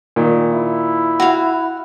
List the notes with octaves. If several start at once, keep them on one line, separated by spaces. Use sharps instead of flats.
A#2 D#3
E4
F#4 F5